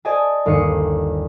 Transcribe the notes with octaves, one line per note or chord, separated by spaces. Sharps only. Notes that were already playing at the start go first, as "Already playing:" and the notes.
C5 D5 D#5 G#5 A5
G1 D#2 D#4 C7 C#7 D#7